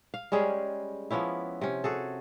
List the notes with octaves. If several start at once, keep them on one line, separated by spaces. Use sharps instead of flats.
F5
G3 G#3 C#4 G#4
F3 B3 C#4 E4
C3 C#4
F#4 G#4 A4